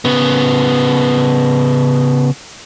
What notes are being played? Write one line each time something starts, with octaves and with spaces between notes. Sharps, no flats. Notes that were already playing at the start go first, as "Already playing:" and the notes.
C#3 B3